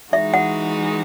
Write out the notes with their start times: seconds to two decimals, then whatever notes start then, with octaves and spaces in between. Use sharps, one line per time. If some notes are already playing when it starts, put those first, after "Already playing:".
0.13 E3 G#3 D#4 F#4 E5
0.34 F#5